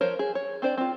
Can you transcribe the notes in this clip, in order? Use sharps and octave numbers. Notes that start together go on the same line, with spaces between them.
F3 A#4 C5 C#5
G#4
C#5
C4 D4 C5 D5
C4 F4